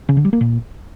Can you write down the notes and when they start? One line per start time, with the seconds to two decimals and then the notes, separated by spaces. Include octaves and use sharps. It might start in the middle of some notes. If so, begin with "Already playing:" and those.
0.09 C#3
0.17 D3
0.25 G3
0.33 A#3
0.41 A#2